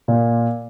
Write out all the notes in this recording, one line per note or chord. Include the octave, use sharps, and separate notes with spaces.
A#2